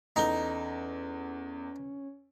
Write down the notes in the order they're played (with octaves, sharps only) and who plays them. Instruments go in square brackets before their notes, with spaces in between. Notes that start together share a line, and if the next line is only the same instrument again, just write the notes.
[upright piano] E2 A4 G7 [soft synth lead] C#4 [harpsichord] D#4